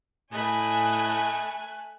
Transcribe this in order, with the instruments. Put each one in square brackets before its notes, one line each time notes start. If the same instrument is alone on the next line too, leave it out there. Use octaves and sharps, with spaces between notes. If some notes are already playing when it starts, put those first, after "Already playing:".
[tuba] A2 [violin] A3 F#6 [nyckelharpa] D#5 B5 [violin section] G#5